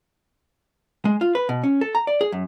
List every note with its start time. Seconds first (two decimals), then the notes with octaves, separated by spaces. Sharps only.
1.05 G#3
1.21 F4
1.35 B4
1.49 B2
1.64 C#4
1.81 A4
1.95 A#5
2.07 D5
2.21 G#4
2.32 F#2